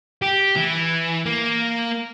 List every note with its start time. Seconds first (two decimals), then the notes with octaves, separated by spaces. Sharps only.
0.22 G4
0.57 E3
1.26 A#3